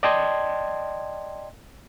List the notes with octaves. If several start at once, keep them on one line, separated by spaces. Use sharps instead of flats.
D5 D#5 G5 A5 C6 G#6